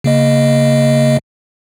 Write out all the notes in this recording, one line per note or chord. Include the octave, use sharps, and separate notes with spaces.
C#3 A#3 D#5